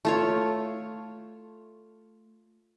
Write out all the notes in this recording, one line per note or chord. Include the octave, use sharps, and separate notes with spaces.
A3 F4 C#5